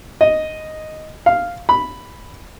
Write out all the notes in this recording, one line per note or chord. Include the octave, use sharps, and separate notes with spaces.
D#5
F5
B5